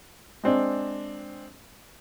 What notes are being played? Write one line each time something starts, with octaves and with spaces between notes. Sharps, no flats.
G#3 C4 D4